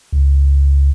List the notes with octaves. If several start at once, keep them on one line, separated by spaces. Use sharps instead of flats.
C#2